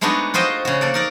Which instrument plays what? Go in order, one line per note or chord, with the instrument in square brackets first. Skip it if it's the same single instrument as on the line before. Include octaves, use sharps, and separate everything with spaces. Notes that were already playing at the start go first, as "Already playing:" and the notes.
[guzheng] G#3 A3 B3 D4 D#4 F#4
F4 F#4 C5 D#5 G5
C#3 F#4
A#3 A4 D5
D#4 A#4 D5